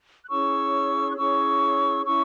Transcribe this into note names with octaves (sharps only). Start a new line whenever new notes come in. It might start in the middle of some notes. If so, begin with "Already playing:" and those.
F#6
C#4 E4 G#4 C#5 C#6 E6
F#6
C#4 E4 G#4 C#5 C#6 E6
C#4 E4 C#6 E6